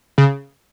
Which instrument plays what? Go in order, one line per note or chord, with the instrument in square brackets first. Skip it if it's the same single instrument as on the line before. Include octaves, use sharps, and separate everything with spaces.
[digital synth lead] C#3